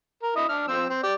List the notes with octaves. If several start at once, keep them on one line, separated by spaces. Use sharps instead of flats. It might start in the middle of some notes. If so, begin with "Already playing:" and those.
A#4
E4 D#5
D4 F6
F3 C4 E6
C4
G4 D5